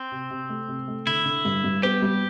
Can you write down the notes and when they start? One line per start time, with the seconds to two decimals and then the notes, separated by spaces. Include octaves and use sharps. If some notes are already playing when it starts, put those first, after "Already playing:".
Already playing: C4
0.12 C3
0.30 C3
0.49 A3
0.68 C3
0.88 A3
1.07 D3 E4
1.25 D3
1.45 G2
1.64 G2
1.83 B3 G4
2.02 G3